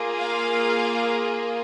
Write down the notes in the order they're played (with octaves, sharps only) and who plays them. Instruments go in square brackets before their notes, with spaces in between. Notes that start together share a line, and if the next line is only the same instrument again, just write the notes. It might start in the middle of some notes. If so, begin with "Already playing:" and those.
Already playing: [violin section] A#3 F4 G#4
F5